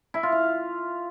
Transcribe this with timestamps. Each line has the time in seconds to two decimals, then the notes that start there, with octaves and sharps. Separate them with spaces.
0.14 E4
0.23 F4
0.32 F5